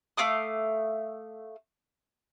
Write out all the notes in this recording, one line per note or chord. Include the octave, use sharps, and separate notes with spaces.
A3 F5 D6 D#6